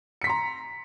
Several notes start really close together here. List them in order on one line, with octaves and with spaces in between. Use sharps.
C#7 B6 C6 A#5